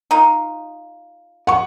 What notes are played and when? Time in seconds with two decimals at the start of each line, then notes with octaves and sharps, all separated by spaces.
0.11 D#4 F4
1.47 F#5 C#6